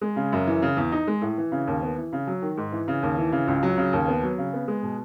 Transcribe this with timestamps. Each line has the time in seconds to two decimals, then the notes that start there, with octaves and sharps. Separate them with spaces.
0.01 G#3
0.16 C#3
0.32 F#2
0.47 E3
0.62 C#3
0.77 E2
0.92 D#4
1.07 G#3
1.22 A2
1.38 E3
1.52 C#3
1.67 D#2
1.83 B3
1.97 E3
2.13 C#3
2.27 F#3
2.42 D#3
2.57 G#2
2.72 E3
2.88 C#3
3.03 D#2
3.18 E3
3.32 C#3
3.48 C#2
3.63 F#3
3.78 C#3
3.93 D#2
4.08 B3
4.23 F#3
4.38 C#3
4.53 B3
4.68 G#3
4.83 B2